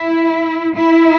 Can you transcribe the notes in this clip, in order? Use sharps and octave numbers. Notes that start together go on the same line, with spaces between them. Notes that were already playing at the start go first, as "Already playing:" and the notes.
Already playing: E4
E4